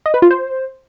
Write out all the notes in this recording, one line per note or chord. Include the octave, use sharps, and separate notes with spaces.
D#5
B4
F4
C5